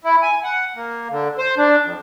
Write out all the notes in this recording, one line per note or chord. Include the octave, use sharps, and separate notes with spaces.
E4
G#5
F#5
A#3
D3
C5
D4
F2